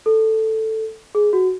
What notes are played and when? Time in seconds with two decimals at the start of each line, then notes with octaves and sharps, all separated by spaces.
0.06 A4
1.15 G#4
1.33 F#4